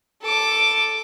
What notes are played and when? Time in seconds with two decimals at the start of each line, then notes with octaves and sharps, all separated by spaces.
0.22 A4 D6